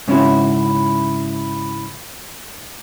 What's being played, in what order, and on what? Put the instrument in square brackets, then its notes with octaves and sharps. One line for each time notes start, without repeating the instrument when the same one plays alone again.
[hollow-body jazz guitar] G#2 C#3 C#4 D4 E4 F#4